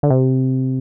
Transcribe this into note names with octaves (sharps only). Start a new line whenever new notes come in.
D3
C3